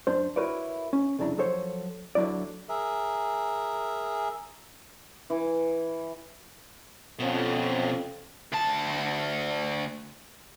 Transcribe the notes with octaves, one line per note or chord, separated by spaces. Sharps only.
F#2 D4 C5
E4 F#4 A#4 B4 C#5 D5
C#4
C2 F2 C#3 D4 E4 A#5
F3 F#3 A4 C5 C#5
D2 D3 F#3 E4 D5
G#4 A#4 E5
E3
F2 B2 C#4
D2 A5